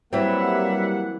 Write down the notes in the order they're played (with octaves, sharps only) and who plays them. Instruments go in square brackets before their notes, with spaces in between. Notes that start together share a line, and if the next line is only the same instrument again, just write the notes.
[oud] E3 F#3 C4 [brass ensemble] G3 A#3 F#5 [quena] E5